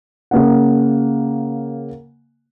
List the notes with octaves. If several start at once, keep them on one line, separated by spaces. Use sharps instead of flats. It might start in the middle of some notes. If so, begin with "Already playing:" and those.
C#3 A#3 F#5